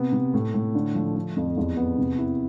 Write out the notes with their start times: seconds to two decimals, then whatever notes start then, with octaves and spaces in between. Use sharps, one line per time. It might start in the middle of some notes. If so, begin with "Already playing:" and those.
Already playing: C3 B3
0.13 C3
0.34 A2
0.54 A2
0.75 D3
0.95 F3
1.16 D3
1.37 F2
1.57 E2
1.77 B3
1.98 C3
2.18 E4